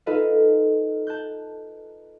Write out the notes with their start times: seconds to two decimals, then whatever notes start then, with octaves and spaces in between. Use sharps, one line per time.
0.06 D#4 F4 A4 B4 D#5 F5
1.07 A5 F#6 G6